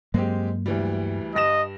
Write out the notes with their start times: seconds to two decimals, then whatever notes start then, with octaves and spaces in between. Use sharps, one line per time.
0.14 G2 F#3 G#3 A#3 C4 G4
0.66 D2 E3 G3
1.35 G2 D#5 A#6 E7